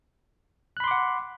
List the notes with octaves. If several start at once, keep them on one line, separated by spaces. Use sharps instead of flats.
F#5 B5 C6 D6 F#6